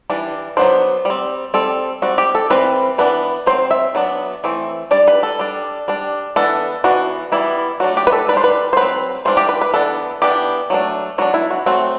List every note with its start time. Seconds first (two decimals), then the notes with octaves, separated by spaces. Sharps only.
0.10 E3 G3 D4
0.57 F#3 B3 D4 C5
1.05 G3 C4
1.54 G3 C4 A4
2.02 G3 C4 F#4
2.18 G4
2.35 A4
2.50 E3 G3 C4 B4
2.98 E3 B3 D4 B4
3.46 F#3 C4 C5
3.71 E5
3.95 F#3 B3 D4
4.44 E3 A3 C4
4.91 G3 D4 D5
5.08 B4
5.23 A4
5.39 G3 D4
5.88 G3 D4
6.36 E3 B3 D4 A4
6.84 E3 B3 D4 F#4
7.32 E3 G3 B3 E4
7.80 F#3 A3 D4 F#4
7.97 G4
8.07 B4
8.13 A4
8.29 D4 B4
8.33 G3 C5
8.44 B4
8.73 C5
8.77 F#3 C4 B4
9.25 E3 G3 D4 C5
9.37 G4
9.49 B4
9.61 B4
9.74 E3 B3 D4 A4
10.22 E3 B3 D4 G4
10.70 F#3 A3 D4
11.18 F#3 B3 D4 F#4
11.34 E4
11.51 F#4
11.66 F#3 A3 C4 F#4